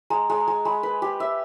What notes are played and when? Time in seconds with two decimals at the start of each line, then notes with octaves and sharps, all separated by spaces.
0.10 G#3 A#5
0.30 G#3
0.38 A#5
0.47 G#3
0.65 G#3 B5
0.83 B4
1.02 G4
1.20 E5